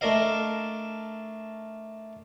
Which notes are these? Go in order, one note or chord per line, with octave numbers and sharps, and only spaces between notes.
A3 D4 A#4 D#5 F5